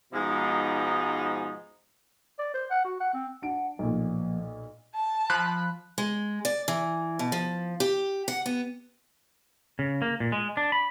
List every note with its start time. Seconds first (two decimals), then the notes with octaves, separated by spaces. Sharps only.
0.13 G#2 B2 F3 G#3 D#4
2.39 D5
2.54 C5
2.71 F#5
2.85 F#4
3.00 F#5
3.14 C4
3.42 D4 F#5 D7
3.79 B1 A#2 F3 A#3
4.95 A5
5.30 F3 B5 F#6
5.98 G#3
6.45 D5
6.68 E3
7.19 B2
7.32 F3
7.80 G4
8.28 F#5
8.46 B3
9.79 C#3
10.02 A#3
10.20 A#2
10.32 G#3
10.57 D4
10.72 B5